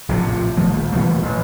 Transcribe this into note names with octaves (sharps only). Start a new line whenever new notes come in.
A#1 A2 C3 F3
D#3 F3 A3
A#1
A#2 E3 F3 A3
A1